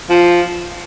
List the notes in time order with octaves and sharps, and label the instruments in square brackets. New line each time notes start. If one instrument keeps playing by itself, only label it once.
[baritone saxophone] F3